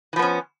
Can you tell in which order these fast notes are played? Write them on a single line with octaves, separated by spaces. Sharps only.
E3 F3 B3 C#4